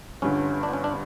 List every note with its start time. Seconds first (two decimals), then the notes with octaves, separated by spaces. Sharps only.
0.22 G1 G2 D3 C#4
0.63 D4
0.69 B3
0.73 C#4
0.84 D4